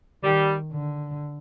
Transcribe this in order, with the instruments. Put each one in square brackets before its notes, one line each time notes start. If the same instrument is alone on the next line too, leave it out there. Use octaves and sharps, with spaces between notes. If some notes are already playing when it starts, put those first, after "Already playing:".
[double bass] D#3 [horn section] G3
[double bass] D3